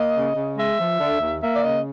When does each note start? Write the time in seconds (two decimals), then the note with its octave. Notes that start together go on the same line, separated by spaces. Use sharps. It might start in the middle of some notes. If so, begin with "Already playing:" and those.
Already playing: A#3 D#5
0.15 C#3
0.35 C#3
0.56 G#3 E5
0.78 F3
0.99 D3
1.20 D#2
1.41 A#3 E5
1.54 D5
1.62 C#3 D#5